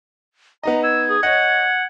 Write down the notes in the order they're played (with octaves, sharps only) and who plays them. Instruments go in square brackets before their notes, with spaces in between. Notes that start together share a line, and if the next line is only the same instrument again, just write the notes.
[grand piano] B3 D#4 D#5 [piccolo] A#5
[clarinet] E6 [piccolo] G#6
[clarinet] G#4
[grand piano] C#5 D#5 [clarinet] F#5